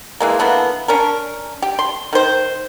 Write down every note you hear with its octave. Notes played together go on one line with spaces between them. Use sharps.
E3 G#3 A#3
D3 E3 A#3 B3
C#4 D4 A#4
G4
C6
D#3 C5